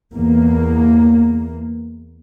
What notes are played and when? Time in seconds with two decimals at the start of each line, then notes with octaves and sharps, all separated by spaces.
0.15 E2 A#3